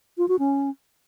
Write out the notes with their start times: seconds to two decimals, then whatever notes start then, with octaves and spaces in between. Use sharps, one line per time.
0.18 F4
0.28 F#4
0.39 C#4